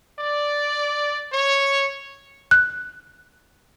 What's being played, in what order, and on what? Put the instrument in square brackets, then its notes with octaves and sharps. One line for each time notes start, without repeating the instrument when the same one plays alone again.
[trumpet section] D5
C#5
[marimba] F#6